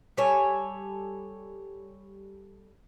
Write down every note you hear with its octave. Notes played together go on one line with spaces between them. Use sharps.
G3 A4 C#5 G#5